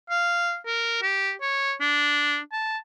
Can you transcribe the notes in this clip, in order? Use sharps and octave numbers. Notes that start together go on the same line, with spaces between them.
F5
A#4
G4
C#5
D4
A5